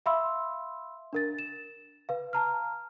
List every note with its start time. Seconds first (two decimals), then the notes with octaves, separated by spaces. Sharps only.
0.06 E5 F5 B5 C6 E6
1.13 D4 A#4 A6
1.39 E7
2.09 B4 F5
2.33 A5 A#5 F6